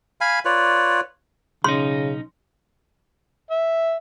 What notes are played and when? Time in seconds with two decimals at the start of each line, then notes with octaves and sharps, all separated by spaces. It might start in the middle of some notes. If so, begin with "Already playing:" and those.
0.21 F5 G#5 B5
0.45 F4 B4 C#5 D5
1.64 B1 C#3 C#4 D#4 C6
3.51 E5